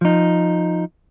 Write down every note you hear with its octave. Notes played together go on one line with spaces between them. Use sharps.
F3 D#4